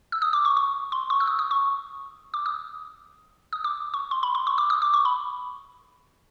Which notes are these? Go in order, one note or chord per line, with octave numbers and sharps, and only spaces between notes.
E6
D#6
D6
C#6
C#6
C6
C#6
E6
D#6
D#6
C#6
D6
D#6
D#6
D6
C#6
C6
B5
C6
C#6
D6
D#6
D6
C#6
B5